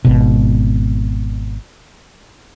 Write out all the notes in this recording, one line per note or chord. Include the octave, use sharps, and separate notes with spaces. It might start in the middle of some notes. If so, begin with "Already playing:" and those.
G#1 B2